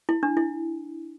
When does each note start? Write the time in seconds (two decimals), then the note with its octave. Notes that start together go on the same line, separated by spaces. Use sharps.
0.09 E4
0.23 D4
0.37 E4